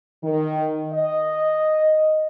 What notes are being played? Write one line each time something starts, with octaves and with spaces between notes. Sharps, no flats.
D#3
D#5